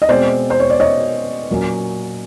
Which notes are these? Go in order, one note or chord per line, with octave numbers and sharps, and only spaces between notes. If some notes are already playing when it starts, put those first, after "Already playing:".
D#5
B2 G#3 C4 C5 D5
C5
C#5
D5
C#5 D#5
A#2 F#3 A#3 C#4